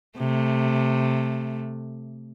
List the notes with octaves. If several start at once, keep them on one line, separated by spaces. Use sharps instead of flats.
C3 A3